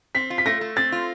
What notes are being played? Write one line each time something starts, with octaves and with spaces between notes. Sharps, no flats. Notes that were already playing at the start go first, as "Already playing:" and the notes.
C4 B6
F4
B6
A3 A#6
A3
C4 A6
F4